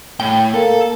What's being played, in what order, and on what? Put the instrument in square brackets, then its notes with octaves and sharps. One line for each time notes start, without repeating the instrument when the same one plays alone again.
[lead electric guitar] A2 [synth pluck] G5
[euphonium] A#3 [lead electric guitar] A4